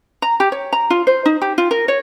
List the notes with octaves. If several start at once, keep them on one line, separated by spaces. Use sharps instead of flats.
A#5
G4
C#5
A#5
F4
C5
D#4
G4
F4
A#4
C#5